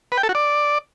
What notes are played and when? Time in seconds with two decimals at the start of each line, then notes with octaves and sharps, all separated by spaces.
0.12 B4
0.18 G5
0.23 A4
0.29 F#4
0.35 D5